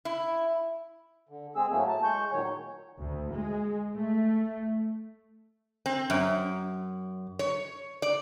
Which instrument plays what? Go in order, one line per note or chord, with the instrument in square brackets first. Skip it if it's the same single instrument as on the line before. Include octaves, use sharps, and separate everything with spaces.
[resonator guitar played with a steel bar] E4
[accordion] D3
G#3 C4 G#4 E6
A2 F#3 A3 A#3
A5
G#3 C#6 G6
A#2 D#3 F#3 C#5
[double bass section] D2
G#3
A3
[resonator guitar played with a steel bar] C4
F#2
C#5
D5